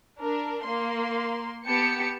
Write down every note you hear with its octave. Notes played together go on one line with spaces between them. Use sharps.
D4 A#4
A#3 C6
B3 G4 A5 C#7